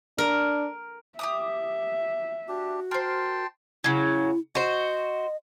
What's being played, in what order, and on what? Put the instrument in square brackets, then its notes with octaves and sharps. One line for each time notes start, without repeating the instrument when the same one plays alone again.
[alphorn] D4 [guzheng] A#4
[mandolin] G4 D6 D#6 [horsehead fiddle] E5
[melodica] D4 G4 [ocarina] F#4
[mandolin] A#4 C5 [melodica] G5 A5 C6
[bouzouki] C#3 F#3 [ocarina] E4
[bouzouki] F#4 C5 [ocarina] D#5